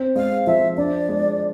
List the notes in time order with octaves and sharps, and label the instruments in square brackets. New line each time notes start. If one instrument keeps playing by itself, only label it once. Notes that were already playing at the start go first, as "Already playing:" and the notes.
Already playing: [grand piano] C4
[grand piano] G#3 [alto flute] F5
[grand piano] F3 [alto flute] E5
[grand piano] D4 [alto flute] D5
[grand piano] G#3